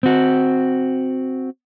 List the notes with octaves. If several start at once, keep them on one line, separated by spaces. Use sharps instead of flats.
C4 F#4